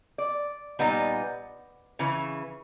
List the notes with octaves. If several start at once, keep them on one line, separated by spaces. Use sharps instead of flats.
D5
A#2 G3 B3 D#4
C#3 E3